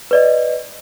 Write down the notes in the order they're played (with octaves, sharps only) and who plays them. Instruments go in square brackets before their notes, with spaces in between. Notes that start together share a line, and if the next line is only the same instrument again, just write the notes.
[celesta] B4 D5 D#5